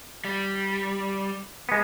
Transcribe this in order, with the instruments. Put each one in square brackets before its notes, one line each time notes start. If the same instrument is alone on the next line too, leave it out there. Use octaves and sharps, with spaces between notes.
[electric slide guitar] G3
[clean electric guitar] G#3 B3